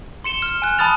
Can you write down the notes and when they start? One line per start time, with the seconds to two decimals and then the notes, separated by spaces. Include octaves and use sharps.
0.24 C6 C#7 E7 G7
0.42 F6
0.62 G#5 F#6
0.78 A5 B5 D#6 F6 A6 F7